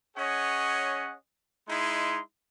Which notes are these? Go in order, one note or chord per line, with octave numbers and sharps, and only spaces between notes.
C#4 G#4 C#5 D#5 F#5
G#3 D#4 E4 C6